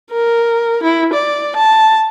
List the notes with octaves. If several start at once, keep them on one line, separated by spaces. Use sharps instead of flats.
A#4
E4
D5
A5